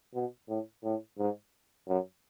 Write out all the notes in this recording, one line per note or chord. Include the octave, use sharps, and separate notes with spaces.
B2
A2
A2
G#2
F#2